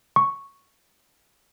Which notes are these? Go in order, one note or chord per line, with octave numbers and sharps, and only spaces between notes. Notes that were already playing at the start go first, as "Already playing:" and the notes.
C#6